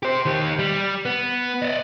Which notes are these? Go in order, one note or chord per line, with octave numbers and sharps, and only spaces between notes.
G4 C5
D#3 G4
G3
B3
D5 D#5